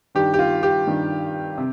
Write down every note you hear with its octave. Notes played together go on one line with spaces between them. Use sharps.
G2 D#3 G3 G4
G4
F4
G4
G2 D#3 G3
C3